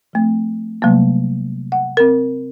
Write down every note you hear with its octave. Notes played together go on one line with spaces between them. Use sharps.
F3 A3 C4
C3 F#3 G3 A3 A#3
F#5
C4 A#4